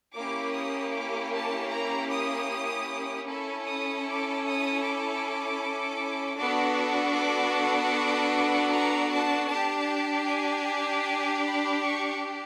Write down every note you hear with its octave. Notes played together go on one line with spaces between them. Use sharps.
A#3 C#4 E4 G4 D6
D#6
D6
A5
A#5
D#6
C#4 E4 A4
D#6
D6
D#6
D6
B3 D4 F#4 A4
D6
D6
D6
A#5
A5
D4 G4 A5
G#5
G#5
B5
C#6